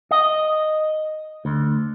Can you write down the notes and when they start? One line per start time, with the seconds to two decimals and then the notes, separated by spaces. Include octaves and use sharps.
0.11 D#5
1.45 D2